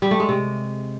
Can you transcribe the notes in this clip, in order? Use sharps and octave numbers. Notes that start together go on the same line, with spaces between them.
G3
A3
G#3
C3